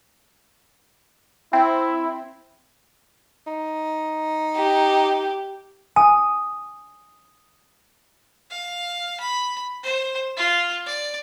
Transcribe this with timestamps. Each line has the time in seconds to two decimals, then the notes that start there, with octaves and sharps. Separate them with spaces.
1.53 C4 E4
3.47 D#4
4.57 G4
5.96 G#5 D#6
8.50 F5
9.20 B5
9.83 C5
10.37 F4
10.86 D5